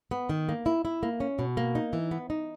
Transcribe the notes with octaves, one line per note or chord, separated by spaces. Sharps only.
B3
D#3
A#3
E4
E4
A#3
C#4
B2
A#3
D#4
E3
B3
D#4